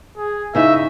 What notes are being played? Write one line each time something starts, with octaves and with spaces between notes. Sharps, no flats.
G#4
C#3 D#4 E4 E5